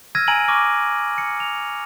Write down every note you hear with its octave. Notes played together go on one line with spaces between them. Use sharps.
E6 F6 G#6 A#6 D#7
G#5 A#5 G#6 D7 D#7 F#7
C#6 D6 F6 A#6
C#7
F7